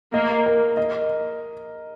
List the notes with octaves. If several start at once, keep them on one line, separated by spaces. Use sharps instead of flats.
A#3 D#5
A#4
D#5